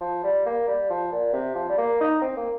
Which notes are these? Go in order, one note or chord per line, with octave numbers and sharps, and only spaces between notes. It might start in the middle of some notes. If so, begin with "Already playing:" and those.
F3
G3
A#3
G3
F3
A#2
C3
F3
G3
A#3
D#4
C4
A#3